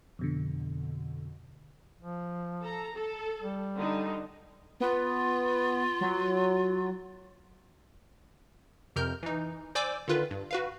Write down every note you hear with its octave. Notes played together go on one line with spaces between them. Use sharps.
F2 B2 D3
F3
A4 A#5
A4
G3
D3 D#4
B3 F4
F#3
F2 C3 A#4 F6 G6
E3 D#4
C5 D5 G#5 D6 E6 G6
D3 D#3 F4 B4
G2
F#4 B4 F5